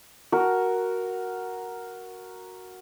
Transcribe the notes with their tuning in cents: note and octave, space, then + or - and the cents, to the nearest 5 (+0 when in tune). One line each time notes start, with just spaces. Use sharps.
F#4 +0 A#4 +0